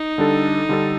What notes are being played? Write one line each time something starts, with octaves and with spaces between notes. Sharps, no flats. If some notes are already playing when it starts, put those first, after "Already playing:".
Already playing: D#4
D3 G3 D4 A4
D3 G3 D4 A4